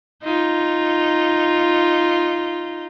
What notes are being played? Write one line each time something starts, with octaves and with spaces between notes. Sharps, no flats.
D#4 F4